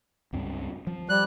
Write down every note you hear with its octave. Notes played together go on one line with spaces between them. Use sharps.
C#2 G2 C4
F3
G3 F#6